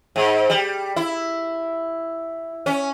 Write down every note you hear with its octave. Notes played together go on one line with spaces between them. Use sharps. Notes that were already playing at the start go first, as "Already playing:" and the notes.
G#2
G3
E4
C#4